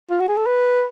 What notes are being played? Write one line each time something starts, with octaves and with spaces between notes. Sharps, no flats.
F4
F#4
G#4
A4
B4